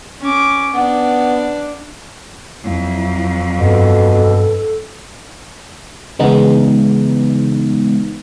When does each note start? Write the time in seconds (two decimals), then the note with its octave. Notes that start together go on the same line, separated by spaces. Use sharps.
0.20 C#4 D6
0.74 B3 D4
2.64 F2 F#3 E4
3.60 G2 B2 A4
6.19 C#3 E3 G#3 B3 D#4